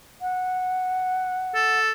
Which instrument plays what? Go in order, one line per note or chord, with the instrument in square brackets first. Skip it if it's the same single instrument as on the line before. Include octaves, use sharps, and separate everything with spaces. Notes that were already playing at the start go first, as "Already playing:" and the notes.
[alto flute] F#5
[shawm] A4